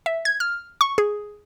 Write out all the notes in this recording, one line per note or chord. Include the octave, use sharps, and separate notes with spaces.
E5
G#6
F6
C#6
G#4